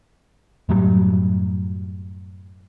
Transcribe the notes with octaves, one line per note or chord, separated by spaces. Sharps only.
F#2 A2 F#3 G3